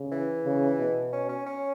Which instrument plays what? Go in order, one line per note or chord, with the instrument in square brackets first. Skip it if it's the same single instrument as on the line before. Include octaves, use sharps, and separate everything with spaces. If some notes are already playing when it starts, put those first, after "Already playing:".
Already playing: [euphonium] C#3
[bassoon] E3
[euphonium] C#3
B2
[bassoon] C#4
C#4
C#4